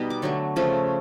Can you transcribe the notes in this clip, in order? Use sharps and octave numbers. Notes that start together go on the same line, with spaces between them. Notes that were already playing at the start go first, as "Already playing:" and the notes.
Already playing: B2 G3 B3 D#4
D6
D3 F#3 A3 C#6
C#3 F3 A3 C#4